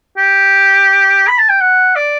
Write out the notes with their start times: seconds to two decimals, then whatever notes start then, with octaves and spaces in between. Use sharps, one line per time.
0.17 G4
1.28 B5
1.39 A5
1.49 G5
1.61 F#5
1.96 D5